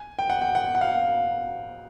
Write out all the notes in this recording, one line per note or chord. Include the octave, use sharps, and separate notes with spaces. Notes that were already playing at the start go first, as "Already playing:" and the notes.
Already playing: G#5
G5
F#5
G5
F#5
F#5
F5